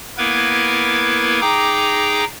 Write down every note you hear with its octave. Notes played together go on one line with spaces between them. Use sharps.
A#3 B3 E4 A#4 B4 G#6
D#4 G#4 G5 A#5 D6